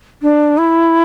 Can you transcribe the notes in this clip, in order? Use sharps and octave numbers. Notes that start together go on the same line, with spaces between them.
D4
E4